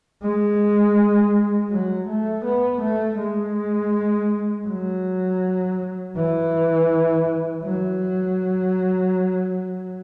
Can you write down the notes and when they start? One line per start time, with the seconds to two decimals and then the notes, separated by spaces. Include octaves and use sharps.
0.23 G#3
1.71 F#3
2.08 A3
2.45 B3
2.82 A3
3.19 G#3
4.67 F#3
6.16 E3
7.64 F#3